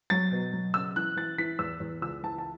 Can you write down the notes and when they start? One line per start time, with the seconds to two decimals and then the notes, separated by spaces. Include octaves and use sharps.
0.10 F#3 A6
0.32 B2
0.53 F#3
0.74 C#3 E6
0.96 E3 F#6
1.16 E3 A6
1.38 E3 B6
1.59 E2 E6
1.80 E2
2.02 C#2 E6
2.23 E3 A5
2.38 A5